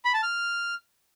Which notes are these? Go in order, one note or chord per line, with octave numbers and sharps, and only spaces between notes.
B5
A5
F6